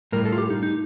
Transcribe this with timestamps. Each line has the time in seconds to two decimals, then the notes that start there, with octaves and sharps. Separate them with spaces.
0.12 A2 G3 A#4
0.25 A4
0.32 F4
0.38 G4
0.50 D#4
0.63 D#4